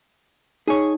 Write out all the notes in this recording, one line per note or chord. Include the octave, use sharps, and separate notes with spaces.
D#4 G#4 C#5